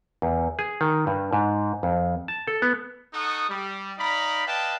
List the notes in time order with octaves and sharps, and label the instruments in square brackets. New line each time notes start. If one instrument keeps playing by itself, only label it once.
[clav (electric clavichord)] E2
G#4
D#3
G2
G#2
F2
A5
A4
B3
[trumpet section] D#4 A4 F#5 C#6 D#6
G3
D#4 D5 F5 A#5 B5
B4 D5 D#5 F5 G5 A5